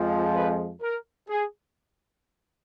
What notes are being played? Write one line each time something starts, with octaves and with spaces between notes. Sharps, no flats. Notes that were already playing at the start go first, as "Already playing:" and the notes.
Already playing: F2 F3 G#3
B4
A#4
G#4